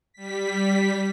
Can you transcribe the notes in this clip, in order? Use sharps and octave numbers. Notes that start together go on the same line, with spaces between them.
G3 B6